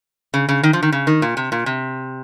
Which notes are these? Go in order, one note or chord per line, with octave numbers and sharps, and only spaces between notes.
C#3
C#3
D#3
F3
D#3
C#3
D#3
A#2
C3
A#2
C3